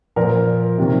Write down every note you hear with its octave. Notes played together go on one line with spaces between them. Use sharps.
A#2 F3 A#4
C3 D#3